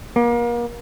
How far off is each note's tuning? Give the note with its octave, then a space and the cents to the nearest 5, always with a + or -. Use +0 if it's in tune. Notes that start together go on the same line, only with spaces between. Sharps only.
A#3 +35